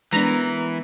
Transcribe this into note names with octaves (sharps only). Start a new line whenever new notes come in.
E3 G#3 B3 D4 A#4 A#5